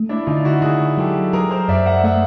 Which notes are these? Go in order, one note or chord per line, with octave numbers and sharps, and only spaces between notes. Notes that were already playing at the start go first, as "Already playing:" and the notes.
Already playing: A3
D4 E4
D3 D#4 F4
E4 F#4
D3 F#4 G#4
F#3 G4 A4
F#3 G#4 A#4
A#4 C5
F#2 D5 E5
E5 F#5
A3 E5 F#5